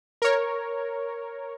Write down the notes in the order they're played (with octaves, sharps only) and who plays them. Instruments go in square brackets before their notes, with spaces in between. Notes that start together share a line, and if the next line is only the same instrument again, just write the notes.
[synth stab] A#4 C#5